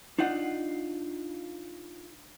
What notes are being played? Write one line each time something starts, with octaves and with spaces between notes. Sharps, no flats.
D4 D#4 F4 F#5